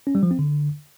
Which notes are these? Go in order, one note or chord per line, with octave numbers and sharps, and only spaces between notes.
C#4
G3
F3
C4
D3